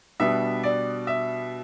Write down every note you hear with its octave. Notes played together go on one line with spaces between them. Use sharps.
B2 G3 B3 D4 E5
D5
E5